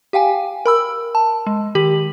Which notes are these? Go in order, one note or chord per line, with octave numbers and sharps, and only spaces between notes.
G4 F5 G5 G#5
A#4 B5 E6
A5
G#3
D#3 G4 F#7